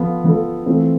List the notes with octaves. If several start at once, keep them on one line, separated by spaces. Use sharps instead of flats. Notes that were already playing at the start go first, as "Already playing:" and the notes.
Already playing: F3 B3 F4 A4
F3 B3 F4 A4
E3 A3 C4 F4 A4